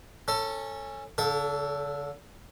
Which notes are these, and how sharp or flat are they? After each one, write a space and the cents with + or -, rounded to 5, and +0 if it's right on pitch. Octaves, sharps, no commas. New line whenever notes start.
C#4 -10 A4 +15
D3 -45 A4 +0